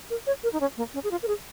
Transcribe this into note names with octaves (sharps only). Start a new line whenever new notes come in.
A#4
C#5
A#4
D#4
C#4
A#3
C#4
G#4
F4
A#4
G#4